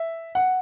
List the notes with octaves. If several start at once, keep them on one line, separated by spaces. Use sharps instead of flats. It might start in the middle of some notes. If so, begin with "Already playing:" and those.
Already playing: E5
F#5